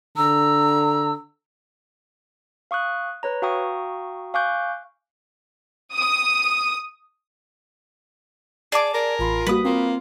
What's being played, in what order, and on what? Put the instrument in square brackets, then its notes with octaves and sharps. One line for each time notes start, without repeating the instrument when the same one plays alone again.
[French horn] D3 [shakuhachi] A#5 [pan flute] E6
[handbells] F5 C#6 D#6 F#6
B4 C#5 A#5
F#4 F5 G5 A#5 C#6 D#6
F5 G#5 C#6 D6 F#6 G6
[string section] D#6
[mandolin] G#4 A5 D6 [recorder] D5
[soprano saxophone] A#4 [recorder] D5
[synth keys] A1 B5 [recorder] F4
[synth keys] G3 A#3 F#4 [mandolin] B4 D#6
[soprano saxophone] A#3 [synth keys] C4 [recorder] F4